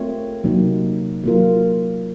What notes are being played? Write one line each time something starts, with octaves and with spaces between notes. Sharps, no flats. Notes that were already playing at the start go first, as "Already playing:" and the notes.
Already playing: A3 C4 F4 A#4 C#5
C3 F#3 A#3 D#4
F#3 A#3 F4 A#4